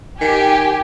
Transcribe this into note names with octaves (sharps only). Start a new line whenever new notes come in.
D#3 G4 G#5